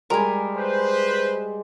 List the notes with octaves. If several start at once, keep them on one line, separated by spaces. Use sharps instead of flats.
G3 G#3 A#4 G#5 C6
B4 C5